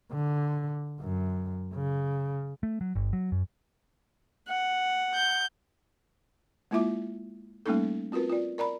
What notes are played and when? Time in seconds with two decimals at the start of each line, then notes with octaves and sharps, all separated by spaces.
0.13 D3
1.01 F#2
1.74 C#3
2.63 A3
2.81 F#3
2.95 G1
3.13 F#3
3.32 F#2
4.48 F#5
5.14 G6
6.71 G#3 A#3 E4 F4 E5 D6
7.66 G3 A3 A#3 C#4 D#4 A4
8.12 C4 F4 F#4 A#4 B4
8.30 F4 D5
8.58 A#4 D5 A#5 B5